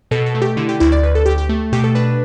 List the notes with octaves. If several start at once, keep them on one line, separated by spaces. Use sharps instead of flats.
B2 A4
A4
A3
G4
D3 E4
G4
D2 E4
D5
D2 B4
A4
D2 G4
G4
A3
B2 G4
A4
D4 B4